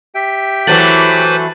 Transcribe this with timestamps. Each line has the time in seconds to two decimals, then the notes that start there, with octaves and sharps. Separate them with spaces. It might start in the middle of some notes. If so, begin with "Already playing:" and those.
0.15 G4 E5 G5
0.67 E3 F#3 A3 B4 C5 A6 F#7